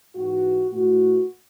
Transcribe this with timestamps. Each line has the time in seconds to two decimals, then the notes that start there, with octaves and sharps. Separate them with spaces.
0.16 G#2 E3 F#4
0.71 A2 E3 F#4